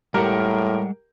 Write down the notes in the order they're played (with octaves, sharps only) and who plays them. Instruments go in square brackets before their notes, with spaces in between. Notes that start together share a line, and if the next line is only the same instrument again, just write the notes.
[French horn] A2 [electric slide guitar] G3 G#3 F#5 [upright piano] G4 A#4